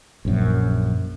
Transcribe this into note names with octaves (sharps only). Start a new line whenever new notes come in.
A#1 F#2